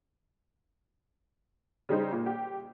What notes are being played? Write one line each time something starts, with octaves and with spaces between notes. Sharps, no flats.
C#3 G3 D#4 C5
A#2
G4